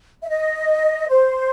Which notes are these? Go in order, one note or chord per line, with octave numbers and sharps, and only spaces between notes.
E5
D#5
C5